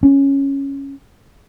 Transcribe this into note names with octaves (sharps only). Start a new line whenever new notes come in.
C#4